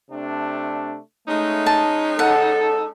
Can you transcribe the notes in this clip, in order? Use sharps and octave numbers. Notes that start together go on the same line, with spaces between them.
C3 A3 D4
G#3 A3 C#4 D#4
A5
A4 F#5